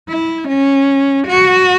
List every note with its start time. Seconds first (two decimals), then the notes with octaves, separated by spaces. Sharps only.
0.09 E4
0.48 C#4
1.28 F#4